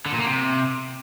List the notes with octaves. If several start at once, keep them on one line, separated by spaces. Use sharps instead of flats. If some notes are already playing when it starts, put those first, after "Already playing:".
D3
A#2
A#3
C3